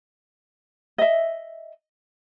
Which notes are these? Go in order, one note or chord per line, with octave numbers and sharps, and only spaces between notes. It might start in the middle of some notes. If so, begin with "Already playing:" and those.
D#5 E5